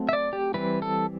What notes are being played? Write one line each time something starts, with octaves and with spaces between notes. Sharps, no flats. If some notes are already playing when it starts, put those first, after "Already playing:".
Already playing: F#3 A3 C4
E5
D5
G4
E3 G3 C4 B4
A4